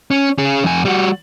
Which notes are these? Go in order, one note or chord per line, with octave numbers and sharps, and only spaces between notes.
C#4
C#4 G#4
F2 G#5
G3 F#4